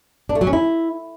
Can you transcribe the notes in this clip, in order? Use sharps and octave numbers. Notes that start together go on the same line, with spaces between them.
D4
A3
F#3
C#4
E4